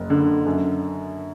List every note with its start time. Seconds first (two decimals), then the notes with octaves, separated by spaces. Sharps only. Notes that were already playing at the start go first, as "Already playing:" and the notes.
Already playing: F#1
0.10 D3
0.46 F#2